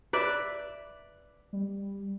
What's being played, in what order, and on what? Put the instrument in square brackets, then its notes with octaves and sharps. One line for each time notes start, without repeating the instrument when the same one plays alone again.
[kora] B4 D5 E5
[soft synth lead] G3